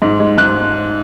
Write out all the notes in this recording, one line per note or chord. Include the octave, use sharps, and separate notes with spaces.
G#2
G#3
G#2 F#6